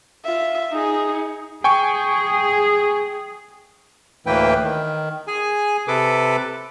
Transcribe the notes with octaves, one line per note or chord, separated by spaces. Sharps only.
F4 E5
D#4 G#4
G#4 G5 G#5 C#6
D2 A2 E3 A#3 B4 G5
D#3
G#4 G#5
C3 A4 B4 D6